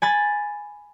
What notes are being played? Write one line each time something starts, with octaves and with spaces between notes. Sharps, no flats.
G#5 B5 A6